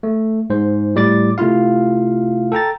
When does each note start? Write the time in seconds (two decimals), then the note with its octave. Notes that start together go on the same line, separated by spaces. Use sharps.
0.03 A3
0.50 G#2 C5
0.95 A2 G3 D5 D6 A6
1.38 C3 A3 E4 F4 F5
2.52 A4 G5 A#5 A6